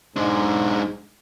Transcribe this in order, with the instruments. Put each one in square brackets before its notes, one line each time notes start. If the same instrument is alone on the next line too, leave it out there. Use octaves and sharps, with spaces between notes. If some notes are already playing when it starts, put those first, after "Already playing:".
[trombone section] B1 G#2 [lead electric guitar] G#3 D4